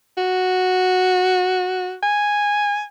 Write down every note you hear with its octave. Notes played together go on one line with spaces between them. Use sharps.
F#4
G#5